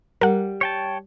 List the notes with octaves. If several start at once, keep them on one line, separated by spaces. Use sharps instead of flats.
G3 A#4 F#5
C#5 G5 A5